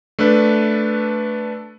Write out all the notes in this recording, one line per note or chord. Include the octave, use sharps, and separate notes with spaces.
A3 D4 A4 B4